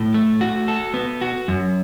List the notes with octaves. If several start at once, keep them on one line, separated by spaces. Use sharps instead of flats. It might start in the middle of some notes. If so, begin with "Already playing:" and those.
Already playing: A2
A3
F#4
A4
B3
F#4
F#2